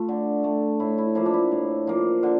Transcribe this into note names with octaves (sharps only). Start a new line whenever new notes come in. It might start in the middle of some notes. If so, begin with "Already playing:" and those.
Already playing: A3 F4
D3
A3
A2 E4
E4
F3 A#3 E4
D4
E4
A2
F3 A#3
D3